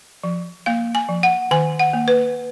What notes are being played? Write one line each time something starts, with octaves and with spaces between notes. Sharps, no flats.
F3
A#3 F5
G#5
F3
F#5
D#3 G#5
F#5
A#3
B4